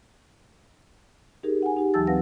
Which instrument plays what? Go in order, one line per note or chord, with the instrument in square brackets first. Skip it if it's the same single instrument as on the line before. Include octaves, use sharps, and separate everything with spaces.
[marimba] D#4 G4 G#4 A#4
F#5 G#5
D#4 G4
D#2 E3 F#3 A5 E6 A6
C4 B4 F5 F#5 A#6